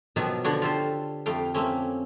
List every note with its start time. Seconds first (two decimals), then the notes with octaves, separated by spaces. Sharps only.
0.16 B2 D#3 F3 F#3 A#3
0.44 D3 F3 D4 F#4 C#5
0.62 F4 G4 A4 C5
1.26 F2 A3 F5 G5
1.54 A3 A#3 C4 C#4